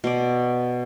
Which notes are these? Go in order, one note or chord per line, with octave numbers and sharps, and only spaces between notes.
B2 D5